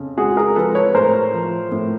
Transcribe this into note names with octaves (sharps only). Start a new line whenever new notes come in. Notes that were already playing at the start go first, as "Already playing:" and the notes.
Already playing: F2 C#3
G#3 F#4 G#4
G#4 A#4
F3 A4 B4
B4 C#5
A2 A#4 C5
F3
A2